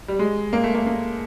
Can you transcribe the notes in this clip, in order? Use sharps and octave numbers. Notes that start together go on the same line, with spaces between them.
G3
G#3
A#3
A3
A#3
A#3